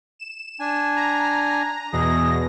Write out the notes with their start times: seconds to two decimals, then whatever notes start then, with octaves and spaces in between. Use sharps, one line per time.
0.19 E7
0.60 D4 G#5
0.96 A#5
1.93 E2 B2 G#4 A#6